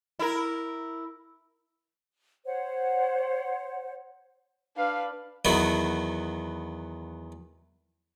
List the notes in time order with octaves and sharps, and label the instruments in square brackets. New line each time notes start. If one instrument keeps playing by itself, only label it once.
[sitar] E4 A#4
[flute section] C5 C#5 F#5
[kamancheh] D4 B4 [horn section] F5
[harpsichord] E2 D#3 F#3 B3